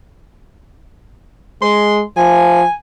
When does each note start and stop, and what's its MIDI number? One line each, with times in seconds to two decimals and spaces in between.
1.62 2.02 56
1.62 2.00 84
2.17 2.63 53
2.17 2.72 80